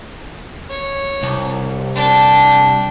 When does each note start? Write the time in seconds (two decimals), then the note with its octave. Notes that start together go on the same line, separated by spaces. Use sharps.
0.70 C#5
1.23 C2
1.95 D4 G5